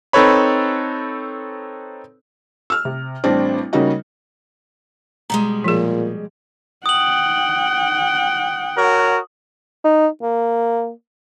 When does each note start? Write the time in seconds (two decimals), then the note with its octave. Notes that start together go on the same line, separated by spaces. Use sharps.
0.13 C4 D#4 A4 B4 C#5 B5
2.70 E6 F6
2.85 C3
3.24 A1 G3 C4 D4
3.73 C#3 G3 A#3 C#4 D#4 F#4
5.30 B2 G3 G#3 A#5
5.64 A#2 F3 G#4
6.86 F#5 G5 D#6 F#7
8.78 F#4 A#4 C#5
9.84 D#4
10.22 A#3